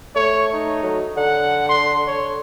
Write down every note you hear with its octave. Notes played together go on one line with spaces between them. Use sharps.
A3 C#5
D#4
F#3
D3 F#5
C6
C#5